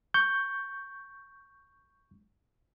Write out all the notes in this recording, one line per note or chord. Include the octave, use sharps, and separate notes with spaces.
C#6 G6